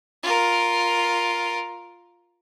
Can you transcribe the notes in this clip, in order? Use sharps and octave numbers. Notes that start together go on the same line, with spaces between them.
F4 A#4